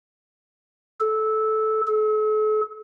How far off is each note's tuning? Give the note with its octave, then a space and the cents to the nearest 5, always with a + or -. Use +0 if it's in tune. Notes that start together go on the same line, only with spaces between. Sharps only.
A4 -15
A4 -40